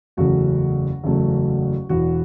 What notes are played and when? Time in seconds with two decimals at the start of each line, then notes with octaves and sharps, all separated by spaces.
0.17 F#1 E2 C#3 F#3 A3 F#4
1.04 F#1 E2 C#3 F#3 A3
1.89 E1 E2 E3 F#4